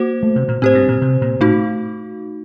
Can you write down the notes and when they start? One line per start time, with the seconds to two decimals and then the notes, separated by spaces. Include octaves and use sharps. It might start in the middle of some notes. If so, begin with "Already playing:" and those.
Already playing: A#3 F#4 C5
0.23 A3
0.36 C3
0.48 A#2
0.62 A2 C4 G4 C5
0.74 G2
0.88 A#2
1.02 C3
1.21 A#2
1.40 A2 A3 D#4 F#4